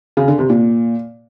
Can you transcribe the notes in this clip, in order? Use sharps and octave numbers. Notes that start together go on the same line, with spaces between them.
C#3
D3
C3
A#2